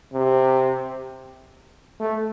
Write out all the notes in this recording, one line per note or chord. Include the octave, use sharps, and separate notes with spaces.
C3
A3